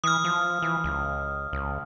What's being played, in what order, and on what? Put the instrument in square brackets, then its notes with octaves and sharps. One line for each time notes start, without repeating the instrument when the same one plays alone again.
[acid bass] E3 [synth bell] D#6 F6
[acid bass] F3
E3
C#2
C#2